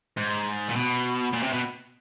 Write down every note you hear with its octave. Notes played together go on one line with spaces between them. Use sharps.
G#2
A#2
B2
A#2
C3
B2